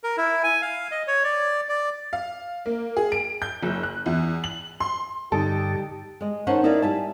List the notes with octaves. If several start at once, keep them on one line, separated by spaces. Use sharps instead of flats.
A#4
E4
G#5
F5
D#5
C#5
D5
D5
F5
A#3
G#4
D7
G6
F#1
F#6
E2
F#7
C6
G2 D3 G3 D#4 G4 A4
G#3 D#5
D#3 C#4 C5 F#5 A5
D#4 E4 A#4 B4 D5 F5
G3 E5 G#5 A5